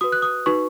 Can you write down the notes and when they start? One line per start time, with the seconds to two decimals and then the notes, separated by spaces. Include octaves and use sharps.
0.01 F#4 B4 D#6
0.12 F#6
0.22 D#6
0.46 D#4 F#4 B4 C#6